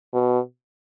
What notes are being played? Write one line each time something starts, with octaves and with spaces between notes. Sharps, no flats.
B2